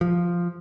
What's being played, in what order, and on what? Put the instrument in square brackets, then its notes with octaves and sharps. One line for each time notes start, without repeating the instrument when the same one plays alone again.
[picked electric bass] F3